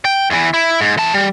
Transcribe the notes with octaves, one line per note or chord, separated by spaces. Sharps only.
G5
E2 E3
E4
G#2
E3 A5
G3